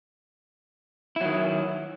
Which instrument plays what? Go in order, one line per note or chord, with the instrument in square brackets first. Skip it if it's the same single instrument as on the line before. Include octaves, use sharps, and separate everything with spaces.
[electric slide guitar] E4
F#3
D#3